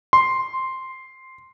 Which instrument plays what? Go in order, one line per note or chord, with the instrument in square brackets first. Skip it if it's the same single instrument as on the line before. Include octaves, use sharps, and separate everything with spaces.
[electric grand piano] C6